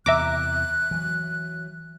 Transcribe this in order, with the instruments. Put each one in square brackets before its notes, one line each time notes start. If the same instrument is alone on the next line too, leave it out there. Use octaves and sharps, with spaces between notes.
[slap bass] E2 C3 E3 [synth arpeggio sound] E5 A#5 D6 [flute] F#6
[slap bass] E3 F#3